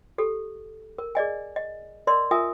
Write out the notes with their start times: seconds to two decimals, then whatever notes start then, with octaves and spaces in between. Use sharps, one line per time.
0.18 G4 A4
0.98 A#4
1.15 G#4 D5 D#5 G#5
1.56 D#5
2.07 A#4 D5 D#5 C6
2.31 F4 A#4 E5 G#5 D#6